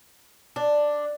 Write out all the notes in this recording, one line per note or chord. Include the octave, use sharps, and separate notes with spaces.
D4